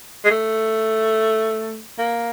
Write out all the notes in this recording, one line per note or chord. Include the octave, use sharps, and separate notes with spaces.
G#3
A3
A#3